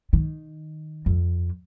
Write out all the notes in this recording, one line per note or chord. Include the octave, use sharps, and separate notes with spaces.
D#3
F2